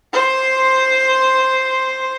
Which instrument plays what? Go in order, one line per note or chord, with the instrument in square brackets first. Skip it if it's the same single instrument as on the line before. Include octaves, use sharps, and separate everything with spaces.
[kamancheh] C5 C6